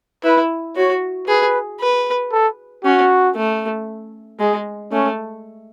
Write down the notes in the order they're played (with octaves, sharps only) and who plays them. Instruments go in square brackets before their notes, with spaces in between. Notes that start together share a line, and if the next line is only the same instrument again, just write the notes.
[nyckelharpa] E4 [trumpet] B4
[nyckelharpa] F#4 [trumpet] C#5
[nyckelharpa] G#4 [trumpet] B4
[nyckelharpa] B4
[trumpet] A4
[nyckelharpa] C#4 [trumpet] F#4
[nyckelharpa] A3
[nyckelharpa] G#3 [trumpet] G#4
[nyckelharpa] A3 [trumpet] C#4